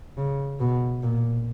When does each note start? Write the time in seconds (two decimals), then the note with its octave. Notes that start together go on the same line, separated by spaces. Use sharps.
0.17 C#3
0.60 B2
1.03 A#2